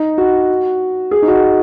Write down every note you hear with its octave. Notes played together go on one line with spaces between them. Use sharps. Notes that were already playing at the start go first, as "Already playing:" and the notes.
Already playing: D#4
F#4
G#4
D#4
F#4